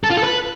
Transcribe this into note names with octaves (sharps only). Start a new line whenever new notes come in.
A4
F4
A4
B4